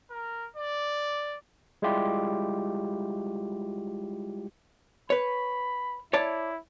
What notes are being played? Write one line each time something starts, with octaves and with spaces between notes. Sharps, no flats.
A#4
D5
G3 G#3 E4 F4 G4
B4 C#5 B5
E4 C#5 D5 A5